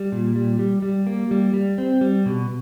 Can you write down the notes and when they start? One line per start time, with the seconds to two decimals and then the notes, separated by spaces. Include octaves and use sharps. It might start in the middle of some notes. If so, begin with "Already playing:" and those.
Already playing: G3
0.12 A#2
0.36 G3
0.59 G3
0.82 G3
1.07 A#3
1.31 G3
1.54 G3
1.78 C4
2.01 G3
2.26 B2